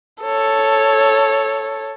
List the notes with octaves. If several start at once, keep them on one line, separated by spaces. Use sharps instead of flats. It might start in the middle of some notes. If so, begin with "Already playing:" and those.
A4 C#5